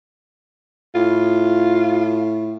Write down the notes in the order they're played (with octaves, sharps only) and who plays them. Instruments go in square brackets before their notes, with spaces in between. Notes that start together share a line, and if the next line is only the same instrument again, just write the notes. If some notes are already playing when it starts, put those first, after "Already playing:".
[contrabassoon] A2 [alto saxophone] F4